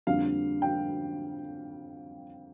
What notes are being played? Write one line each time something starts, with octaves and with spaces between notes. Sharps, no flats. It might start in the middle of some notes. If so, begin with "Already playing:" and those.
F2 D3 G3 A#3 F5
G5